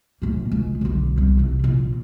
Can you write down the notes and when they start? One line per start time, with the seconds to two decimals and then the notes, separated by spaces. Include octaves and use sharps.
0.22 D1 A#3
0.52 C#2
0.81 B1 D3
1.18 C2
1.37 C3 E4
1.64 A#1